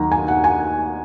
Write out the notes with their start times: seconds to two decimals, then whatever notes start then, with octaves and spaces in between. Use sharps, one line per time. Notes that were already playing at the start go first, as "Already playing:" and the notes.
Already playing: D#2 D#3 F#3 A#5
0.12 G#5
0.28 F#5
0.44 G#5